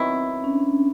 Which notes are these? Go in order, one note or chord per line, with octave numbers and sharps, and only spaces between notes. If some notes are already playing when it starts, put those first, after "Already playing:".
Already playing: D#3 F#3 B3 C4 E4
C#4
D4
C#4